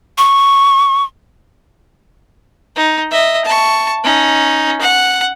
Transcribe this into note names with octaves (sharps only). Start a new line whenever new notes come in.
C#6
D#4
D#5 E5
A5 C#6
C#4 D#4
F#5